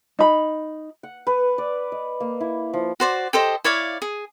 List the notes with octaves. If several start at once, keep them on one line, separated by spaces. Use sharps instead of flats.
D#4 B5
F#5
B4
D5
D#5
A#3
E4
F3
F#4 C5 D5
G4 A4 C5 D#5
E4 C#5 D5 F5
G#4